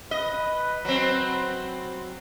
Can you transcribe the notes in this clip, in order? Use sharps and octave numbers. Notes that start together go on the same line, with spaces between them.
B4 D#5
F#3 C4